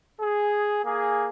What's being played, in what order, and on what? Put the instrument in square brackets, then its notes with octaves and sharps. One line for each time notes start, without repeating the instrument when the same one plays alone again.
[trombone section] G#4
A#3 G#4